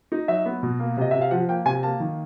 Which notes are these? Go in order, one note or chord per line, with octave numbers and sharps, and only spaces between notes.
D#4
F#3 E5
B3
B2
A#3
C3 D#5
C3 E5
F5
F3 F#5
A#3 G5
C3 G#5
A#3 A5
D#3